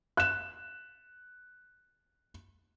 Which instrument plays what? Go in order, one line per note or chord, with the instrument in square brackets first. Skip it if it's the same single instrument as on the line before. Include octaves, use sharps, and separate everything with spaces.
[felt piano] F#6 E7